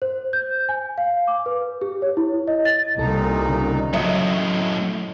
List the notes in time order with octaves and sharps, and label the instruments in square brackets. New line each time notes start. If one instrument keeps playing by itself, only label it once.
[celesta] C5
G6
G#5
F5
D6
B4
G4
C#5
E4
D#5
A6
[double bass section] C2 [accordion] A#2 D#3 D#4 [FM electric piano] A4
[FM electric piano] C#3
[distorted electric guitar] F#2 A2 [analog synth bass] F#3 [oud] C#5 [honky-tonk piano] D#5 E5